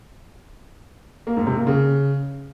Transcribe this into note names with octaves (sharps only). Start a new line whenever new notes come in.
A#3
G#2
C3
A#3
C#3